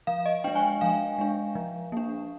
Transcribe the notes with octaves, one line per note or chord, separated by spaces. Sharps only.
F3 F5
D#5
G#3 D4 G5
G#5
G5
F3 F5
G#3 D4
F3
A#3 D4